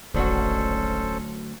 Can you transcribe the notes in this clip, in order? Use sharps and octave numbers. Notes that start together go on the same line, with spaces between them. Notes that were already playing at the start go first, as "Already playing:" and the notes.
D1 G#1 D2 F#3 C#4 F#4 A4 C5